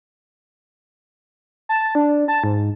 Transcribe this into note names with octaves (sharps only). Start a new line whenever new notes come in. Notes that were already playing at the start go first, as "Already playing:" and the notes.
A5
D4
A5
G#2